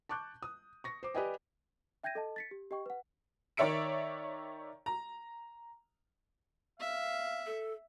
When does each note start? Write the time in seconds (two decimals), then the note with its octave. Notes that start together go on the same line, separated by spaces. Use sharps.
0.09 A5 C#6 D6 F#6 G6
0.43 D#6
0.84 C#6 A#6 C#7
1.03 C5 D6
1.15 G4 B4 D5 D#5 G5 G#5
2.04 E5 G5 G6 G#6 A#6 D#7
2.15 A4 D#5 A5
2.36 A6 B6 C#7
2.51 G4
2.71 G4 D#5 G5 C#6
2.86 B4 F#5
3.57 D#3 C#5 D5 E5 C#7 D7
4.86 A#5
6.80 E5 F5
7.46 A4